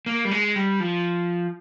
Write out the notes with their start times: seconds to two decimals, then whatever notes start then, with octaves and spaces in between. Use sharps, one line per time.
0.06 A#3
0.25 G3
0.31 G#3
0.56 G3
0.80 F3